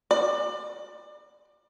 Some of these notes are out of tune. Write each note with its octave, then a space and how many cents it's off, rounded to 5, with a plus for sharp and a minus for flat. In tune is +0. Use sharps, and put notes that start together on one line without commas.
D5 +30